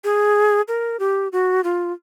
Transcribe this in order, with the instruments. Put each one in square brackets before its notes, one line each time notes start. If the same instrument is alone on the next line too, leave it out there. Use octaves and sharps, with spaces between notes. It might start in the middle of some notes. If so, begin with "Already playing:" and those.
[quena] G#4
A#4
G4
F#4
F4